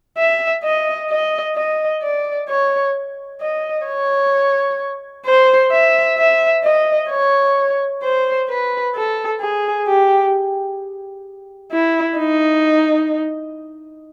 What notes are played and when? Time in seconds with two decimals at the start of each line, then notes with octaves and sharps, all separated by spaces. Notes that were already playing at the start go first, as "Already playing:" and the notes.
0.17 E5
0.63 D#5
1.10 D#5
1.56 D#5
2.02 D5
2.49 C#5
3.41 D#5
3.86 C#5
5.25 C5
5.72 E5
6.18 E5
6.64 D#5
7.10 C#5
8.03 C5
8.49 B4
8.95 A4
9.41 G#4
9.87 G4
11.71 E4
12.18 D#4